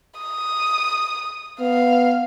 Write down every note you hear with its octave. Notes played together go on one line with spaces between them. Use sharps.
D#6
B3 F5